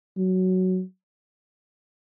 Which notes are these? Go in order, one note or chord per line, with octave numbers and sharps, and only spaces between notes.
F#3